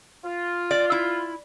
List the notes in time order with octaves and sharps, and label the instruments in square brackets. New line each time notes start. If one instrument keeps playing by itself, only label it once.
[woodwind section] F4
[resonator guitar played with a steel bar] D5
E4